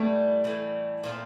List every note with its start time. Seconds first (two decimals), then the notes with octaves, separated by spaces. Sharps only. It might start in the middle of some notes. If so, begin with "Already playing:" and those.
Already playing: A2 E3 G3 A3
0.44 A2 E3 G3
1.04 A#2 F3 C4